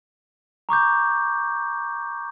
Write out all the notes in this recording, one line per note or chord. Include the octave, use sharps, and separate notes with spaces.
A#5 C#6 D6 G6